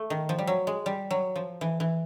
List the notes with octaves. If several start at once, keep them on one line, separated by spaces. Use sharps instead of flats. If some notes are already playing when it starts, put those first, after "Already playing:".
Already playing: A3
D#3
F3
G3
F#3
G#3
G3
F#3
F3
E3
E3